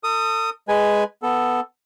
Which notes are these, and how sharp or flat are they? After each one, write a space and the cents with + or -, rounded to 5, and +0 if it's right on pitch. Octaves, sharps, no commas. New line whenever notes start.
A4 +40 D#6 +0
G#3 +0 B4 +0 G#5 +0
B3 +0 A4 +0